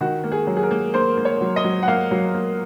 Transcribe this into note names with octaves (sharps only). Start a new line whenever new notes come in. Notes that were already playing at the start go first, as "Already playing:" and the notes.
D#3 F#4
A#3
G#4
F#3
G#4
A#4
A#3
A#3 C5
A#3
C#5
F#3
D#5
F#3
F#5
A#3 F5
F#3
A#3